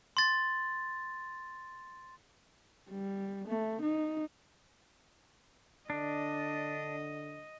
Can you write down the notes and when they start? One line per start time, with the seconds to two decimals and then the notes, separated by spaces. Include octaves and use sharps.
0.17 C6 A6
2.90 G3
3.48 A3
3.82 D#4
5.90 D3 D4 D#5